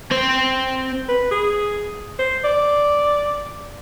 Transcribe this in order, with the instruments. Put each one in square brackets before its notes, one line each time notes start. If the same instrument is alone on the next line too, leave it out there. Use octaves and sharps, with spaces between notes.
[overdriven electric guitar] C4 C5
[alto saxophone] B4
G#4
C5
D5